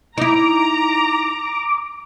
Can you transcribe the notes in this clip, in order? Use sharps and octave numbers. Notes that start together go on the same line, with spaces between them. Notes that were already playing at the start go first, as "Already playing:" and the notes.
D#4 E4 A#5 D6